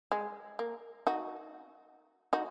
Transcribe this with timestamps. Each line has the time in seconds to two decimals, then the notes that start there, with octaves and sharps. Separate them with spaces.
0.12 G#3
0.59 A#3
1.07 D#4 F#4
2.33 D#4 F#4